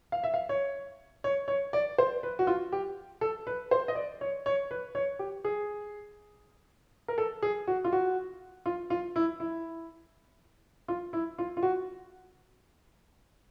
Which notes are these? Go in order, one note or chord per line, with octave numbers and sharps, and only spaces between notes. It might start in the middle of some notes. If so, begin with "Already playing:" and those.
F5
E5
F5
C#5
C#5
C#5
D5
C5
B4
F#4
F4
G4
A4
B4
C5
D#5
D5
C#5
C#5
B4
C#5
G4
G#4
A#4
A4
G#4
F#4
F4
F#4
F4
F4
E4
E4
F4
E4
F4
F4
F#4